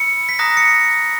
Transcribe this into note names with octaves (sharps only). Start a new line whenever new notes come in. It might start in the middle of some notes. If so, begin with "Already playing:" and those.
Already playing: B5 E6 C#7
B6
A#5 D#6 F#6 A#6
C#7